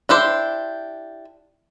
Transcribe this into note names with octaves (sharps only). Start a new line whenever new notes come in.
D4 E4 G4 C5